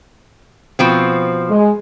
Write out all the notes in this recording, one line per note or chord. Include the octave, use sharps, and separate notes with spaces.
B2 F3 C4
G#3